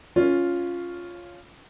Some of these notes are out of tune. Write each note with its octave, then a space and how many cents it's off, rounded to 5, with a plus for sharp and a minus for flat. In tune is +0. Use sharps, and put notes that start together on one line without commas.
C#4 +5 F4 +0 F5 +0